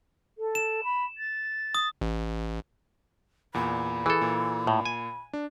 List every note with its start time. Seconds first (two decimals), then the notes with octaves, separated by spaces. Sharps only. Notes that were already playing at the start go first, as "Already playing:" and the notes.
0.38 A4
0.55 E7
0.83 B5
1.17 A6
1.75 D#6
2.01 A1
3.54 E2 A#2 B5
4.06 E3 G#4 A4
4.21 A#2
4.67 A2
4.85 G#5
5.33 D4